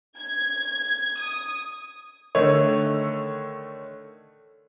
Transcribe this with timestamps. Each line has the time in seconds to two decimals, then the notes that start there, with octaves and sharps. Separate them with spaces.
0.18 G#6
1.21 D#6
2.35 D3 D#3 A3 C#5